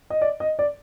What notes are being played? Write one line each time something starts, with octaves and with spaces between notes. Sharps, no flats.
D#5
D5
D#5
D5